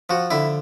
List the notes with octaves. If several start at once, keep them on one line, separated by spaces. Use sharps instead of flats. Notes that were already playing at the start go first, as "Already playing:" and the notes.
F3 F#4
D3 E4